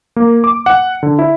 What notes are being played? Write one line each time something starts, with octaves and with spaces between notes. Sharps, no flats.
A#3
D6
F#5
D3
E4